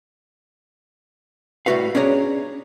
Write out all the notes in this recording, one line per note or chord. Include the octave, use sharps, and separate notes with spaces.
A2 G3 A3 F#4 B4 F5
C#4 D4 G#4 C#5 A#5